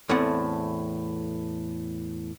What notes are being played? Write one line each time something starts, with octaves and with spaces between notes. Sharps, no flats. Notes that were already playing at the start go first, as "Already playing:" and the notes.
E2 A2 A3 C4 F#5